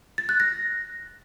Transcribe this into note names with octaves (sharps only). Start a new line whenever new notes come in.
A6
F#6
A#6